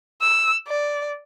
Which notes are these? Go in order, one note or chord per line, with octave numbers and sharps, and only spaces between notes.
E6
D5